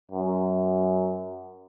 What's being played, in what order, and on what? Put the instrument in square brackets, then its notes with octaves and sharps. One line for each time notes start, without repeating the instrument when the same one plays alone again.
[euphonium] F#2